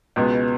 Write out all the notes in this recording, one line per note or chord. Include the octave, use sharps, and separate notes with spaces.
C#2 B2 G#3 B3